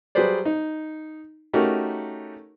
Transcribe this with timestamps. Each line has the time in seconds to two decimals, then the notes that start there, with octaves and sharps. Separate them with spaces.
0.15 F#3 G3 G#4 B4 C5 D5
0.45 D#4
1.53 A3 C#4 D#4 F#4 G4 A#4